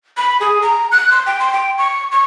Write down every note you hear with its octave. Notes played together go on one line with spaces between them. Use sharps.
B5
G#4
A#5
F#6
C6
G5
C6
G5
C#6
C#6